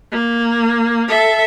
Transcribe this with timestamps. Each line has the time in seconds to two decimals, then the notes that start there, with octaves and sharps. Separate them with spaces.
0.12 A#3
1.08 A4 E5